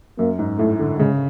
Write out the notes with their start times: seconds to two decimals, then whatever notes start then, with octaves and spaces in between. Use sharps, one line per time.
0.18 F#2 A#3
0.39 G#2
0.58 A2 A3
0.79 D3
0.99 C#3 G#3